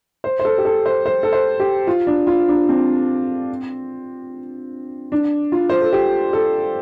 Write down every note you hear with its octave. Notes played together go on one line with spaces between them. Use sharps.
C5
C5
A4
G4
A4
C5
C5
A4
C5
G4
F4
D4
F4
D4
C4
D4
F4
C5
A4
G4
A4